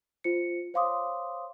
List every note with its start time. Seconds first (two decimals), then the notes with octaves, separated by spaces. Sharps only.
0.24 F4 C5 C#7
0.74 C5 C#5 F5 C6 D6 D#6